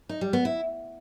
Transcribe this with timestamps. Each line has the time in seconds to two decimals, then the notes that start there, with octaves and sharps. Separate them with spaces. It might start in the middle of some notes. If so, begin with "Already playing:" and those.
0.09 D#4
0.21 G3
0.33 B3
0.45 E4